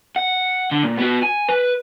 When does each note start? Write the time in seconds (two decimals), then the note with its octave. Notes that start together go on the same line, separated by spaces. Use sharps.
0.16 F#5
0.71 D3
0.84 A#2
0.99 B3 F#4
1.23 G#5
1.49 B4